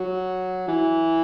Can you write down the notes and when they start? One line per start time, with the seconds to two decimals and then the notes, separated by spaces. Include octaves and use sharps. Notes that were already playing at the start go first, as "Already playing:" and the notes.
Already playing: F#3
0.68 E3